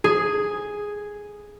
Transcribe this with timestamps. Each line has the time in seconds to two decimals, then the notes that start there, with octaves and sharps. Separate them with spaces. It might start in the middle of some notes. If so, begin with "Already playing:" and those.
0.04 G#4